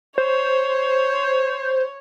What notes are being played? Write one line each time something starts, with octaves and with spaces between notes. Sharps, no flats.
C5 C#5